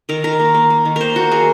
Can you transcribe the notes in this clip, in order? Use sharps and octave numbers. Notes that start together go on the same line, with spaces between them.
D#3 A#4
D#3 A#4
A#3
A#3
A#3
D#3
A#3 A#4 C5
A#3 F#4
F#3 G#4